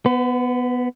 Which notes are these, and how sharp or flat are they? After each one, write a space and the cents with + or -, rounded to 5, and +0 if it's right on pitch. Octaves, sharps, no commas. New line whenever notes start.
B3 +0 B4 +45